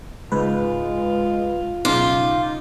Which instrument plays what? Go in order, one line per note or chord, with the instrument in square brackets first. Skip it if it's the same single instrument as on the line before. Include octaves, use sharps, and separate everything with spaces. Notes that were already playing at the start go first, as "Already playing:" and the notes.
[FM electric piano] C#2 G#2 B4 [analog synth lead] G#3 [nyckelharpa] F4
[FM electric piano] B1 C#3 D6 [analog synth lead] D#4 [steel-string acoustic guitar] F4